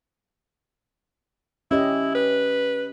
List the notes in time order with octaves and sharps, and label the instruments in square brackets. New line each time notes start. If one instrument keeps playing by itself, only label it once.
[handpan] C#4 G4 D#5 [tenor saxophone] E4
[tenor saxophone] B4